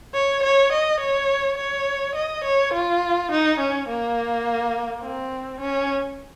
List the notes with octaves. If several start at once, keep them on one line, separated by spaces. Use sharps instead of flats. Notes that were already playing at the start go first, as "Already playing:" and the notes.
C#5
C#5
D#5
C#5
C#5
D#5
C#5
F4
D#4
C#4
A#3
C4
C#4